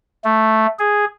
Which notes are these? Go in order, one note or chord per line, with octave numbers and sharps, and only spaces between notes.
A3
G#4